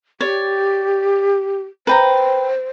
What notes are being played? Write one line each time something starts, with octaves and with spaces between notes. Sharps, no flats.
G4 C#5 D5
B4 C5 G5 A#5